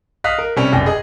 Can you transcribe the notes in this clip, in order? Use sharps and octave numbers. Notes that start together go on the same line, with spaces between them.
D#5 F5 D#6 F#6 B6
A#4
C3 G3 C4 C#4
F1 F#2 D5 G5 A#6
G#4 D#5